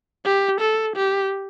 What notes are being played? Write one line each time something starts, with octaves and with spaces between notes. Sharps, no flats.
G4
A4
G4